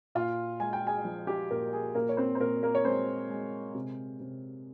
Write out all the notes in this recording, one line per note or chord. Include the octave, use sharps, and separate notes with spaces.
A#2 F4 F5
G#3 G#5
G5
G#4 G#5
F3
G4 G5
A#2 A#3 A#4
G#4
A#2 A#3 A#4
C#5
C4 C5
C5
A#2 A#3 A#4
A#3 A#4
C#5
G#3 C4 C5
G#3
C3
C3